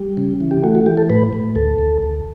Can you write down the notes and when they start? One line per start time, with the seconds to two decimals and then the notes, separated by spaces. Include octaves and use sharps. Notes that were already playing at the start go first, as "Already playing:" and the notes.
Already playing: G3
0.17 C#3
0.41 E3
0.51 G4
0.64 A3 F#4
0.75 F#4
0.86 E3 G4
0.97 A4
1.09 A2 B4
1.33 A2
1.55 D2 A4
1.78 D2
2.02 D2